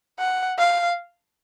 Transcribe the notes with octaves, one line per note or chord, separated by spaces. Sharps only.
F#5
F5